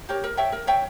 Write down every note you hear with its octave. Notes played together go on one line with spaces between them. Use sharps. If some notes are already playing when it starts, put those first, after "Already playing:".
G4 A#4 C#5
A#4
C#5 E5 G5
A#4
C#5 E5 G5